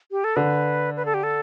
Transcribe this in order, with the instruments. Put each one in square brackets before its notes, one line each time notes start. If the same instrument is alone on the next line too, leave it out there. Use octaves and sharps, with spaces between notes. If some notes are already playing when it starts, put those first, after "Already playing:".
[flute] G4
A4
[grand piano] D3 [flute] B4
[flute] B4
A4
G4
A4